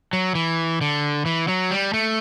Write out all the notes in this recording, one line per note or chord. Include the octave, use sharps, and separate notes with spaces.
F#3
E3
D3
E3
F#3
G3
A3